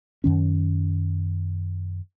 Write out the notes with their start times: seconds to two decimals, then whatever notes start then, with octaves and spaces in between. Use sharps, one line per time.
0.24 F#2 D#3 C#4